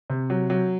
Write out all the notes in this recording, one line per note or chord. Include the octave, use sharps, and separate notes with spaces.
C3
F#3
F#3